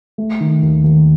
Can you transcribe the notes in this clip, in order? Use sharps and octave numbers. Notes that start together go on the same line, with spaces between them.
A3
D#3
D#2
D#2